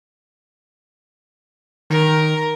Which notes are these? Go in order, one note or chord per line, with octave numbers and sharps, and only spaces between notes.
D#3 A#4